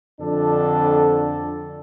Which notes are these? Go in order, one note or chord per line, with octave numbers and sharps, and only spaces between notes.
F2 D3 D4 A4